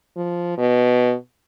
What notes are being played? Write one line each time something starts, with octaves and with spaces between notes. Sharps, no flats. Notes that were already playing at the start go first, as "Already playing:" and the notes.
F3
B2